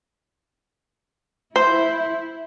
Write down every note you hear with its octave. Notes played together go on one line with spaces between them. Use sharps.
E4 C5